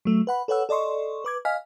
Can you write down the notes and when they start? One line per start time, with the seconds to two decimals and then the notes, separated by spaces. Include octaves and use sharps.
0.05 F#3 A3
0.27 B4 F#5 B5
0.48 A4 B4 C#5 F#5 E6
0.69 A4 D5 D#5 C6 C#6
1.24 B4 D6 G#6
1.45 D#5 F5 G#5 F6 B6